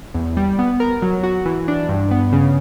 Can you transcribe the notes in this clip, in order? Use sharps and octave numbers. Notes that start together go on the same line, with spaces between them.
E2
G3
B3
A#4
F#3
F#4
E3
D4
G2
B3
C#3